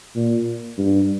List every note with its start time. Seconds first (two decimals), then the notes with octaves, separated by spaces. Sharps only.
0.16 A#2
0.78 G2